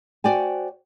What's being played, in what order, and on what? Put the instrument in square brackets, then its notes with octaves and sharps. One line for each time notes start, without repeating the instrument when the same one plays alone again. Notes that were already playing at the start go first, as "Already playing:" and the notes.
[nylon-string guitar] F#4 C5 D5 G5 G#5